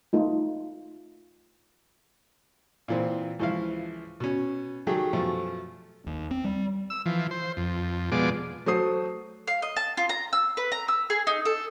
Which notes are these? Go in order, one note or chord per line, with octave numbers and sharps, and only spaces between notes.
A3 D#4 F4
A#2 E3 C4
C#2 E3 F3 E4 F5
B2 C#4
D#3 F#3 A3 G4 G#4
F#2 B2 F3 A3
D#2
C4
G3
E6
E3 F3
C5
F2
B2 F3 G#3 D5
F#3 A3 C5 D#6 C7
F5
D#5
A5
F4
A#5
E6
B4
A#5
E6
G#4
D#4
A4